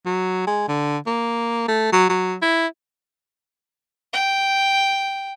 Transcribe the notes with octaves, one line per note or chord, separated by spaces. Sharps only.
F#3
G#3
D3
A#3
A3
F#3
F#3
E4
G5